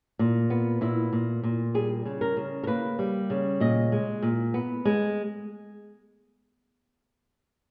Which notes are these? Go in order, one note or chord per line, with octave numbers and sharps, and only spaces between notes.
A#2
B3
A#2 E4
A#2
A#2
G3 G#4
C#3
A#4
C#3
A#4
A#3 B4
G3
C#3
A#2 D#5
G#3
A#2
B3
G#3